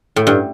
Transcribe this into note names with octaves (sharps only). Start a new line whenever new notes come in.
A2
G2